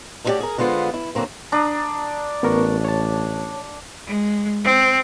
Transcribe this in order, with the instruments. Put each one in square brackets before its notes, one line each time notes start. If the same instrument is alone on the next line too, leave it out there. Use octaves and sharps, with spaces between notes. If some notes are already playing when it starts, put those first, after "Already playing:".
[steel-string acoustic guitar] A3 C#4 E4 F#4 G4 D5
G#4 A#4
D3 G#3 B3 F4 C5
E4
D3 F#3 A#3 C4
[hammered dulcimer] D4 [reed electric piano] A#5 D#6
[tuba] A1 [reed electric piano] B3 A#4 C#6
[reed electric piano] C#5 A5
[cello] G#3
C4